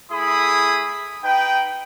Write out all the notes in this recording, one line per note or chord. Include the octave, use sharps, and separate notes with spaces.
A3 E4 G#4 B5 D#6
D#4 B4 G5